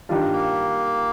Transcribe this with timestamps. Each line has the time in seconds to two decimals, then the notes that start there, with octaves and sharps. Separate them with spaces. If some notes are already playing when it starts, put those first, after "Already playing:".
0.09 G2 D#3 G3 D4 F4
0.32 A#3